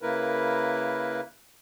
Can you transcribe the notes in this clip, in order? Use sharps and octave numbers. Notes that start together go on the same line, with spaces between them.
C#3 A#3 E4 A#4 B4